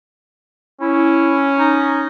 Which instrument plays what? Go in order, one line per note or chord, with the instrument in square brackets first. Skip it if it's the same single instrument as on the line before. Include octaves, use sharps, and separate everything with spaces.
[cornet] C#4 [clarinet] E4
[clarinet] D#4